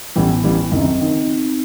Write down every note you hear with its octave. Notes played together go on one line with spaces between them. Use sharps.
A1 A2 E3 G3 B3
A1 A2 E3 G3
F#1 F#2 D#3 C4
D#3 D#4